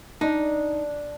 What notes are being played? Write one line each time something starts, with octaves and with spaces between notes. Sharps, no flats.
D4 D#4